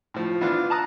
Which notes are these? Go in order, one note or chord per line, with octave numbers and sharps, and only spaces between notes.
A2 F3
E3 B3 D4 F4
A5 A#5 D#6 F#6